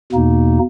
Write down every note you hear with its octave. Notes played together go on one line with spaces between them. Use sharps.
E2 B2 A#3 D#4